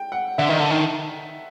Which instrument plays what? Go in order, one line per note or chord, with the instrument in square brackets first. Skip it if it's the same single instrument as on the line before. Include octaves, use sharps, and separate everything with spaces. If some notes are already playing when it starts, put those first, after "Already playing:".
Already playing: [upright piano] G5
F#5
[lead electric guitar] D3 [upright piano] E5
[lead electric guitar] D#3
D3
D#3